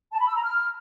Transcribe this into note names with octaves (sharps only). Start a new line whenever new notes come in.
A5
B5
E6
A#5
F6